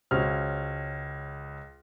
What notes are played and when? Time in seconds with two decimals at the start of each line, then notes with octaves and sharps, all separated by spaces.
0.11 C#2 C#4 F#4 C5 F6